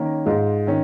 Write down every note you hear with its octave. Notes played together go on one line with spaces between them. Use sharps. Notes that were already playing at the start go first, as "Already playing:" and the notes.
Already playing: D#3 A#3 C#4
G#2 G#3 F4
D#3 C#4